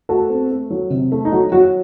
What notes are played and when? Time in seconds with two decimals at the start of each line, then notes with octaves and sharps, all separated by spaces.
0.09 A3 F#4 A4
0.29 C4
0.50 A3
0.70 F#3
0.90 C3
1.12 A3
1.25 D#4
1.32 F#3 F#4
1.52 F#3 F#4